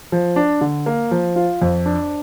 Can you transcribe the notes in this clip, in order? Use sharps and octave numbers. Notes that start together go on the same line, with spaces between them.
F3
D4
D3
A#3
F3
F4
F2
D4